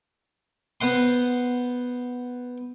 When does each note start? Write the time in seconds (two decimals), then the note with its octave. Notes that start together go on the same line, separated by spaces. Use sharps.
0.81 B3 C5 F#5 C6